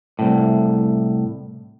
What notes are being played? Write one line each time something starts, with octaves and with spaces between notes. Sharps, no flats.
C2 A2